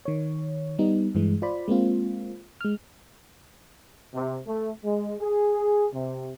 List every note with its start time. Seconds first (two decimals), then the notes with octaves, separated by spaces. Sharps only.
0.05 D#3 C#5
0.79 G3 B3 D#4
1.15 G2 E3 G#3
1.42 F4 C5 D5 B5
1.68 G#3 A#3 C4 F4
2.61 G#3 F6
4.13 C3
4.46 A3
4.84 G#3
5.21 G#4
5.92 C3